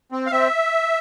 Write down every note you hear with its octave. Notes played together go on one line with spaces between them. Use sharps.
C4
F5
C4 E5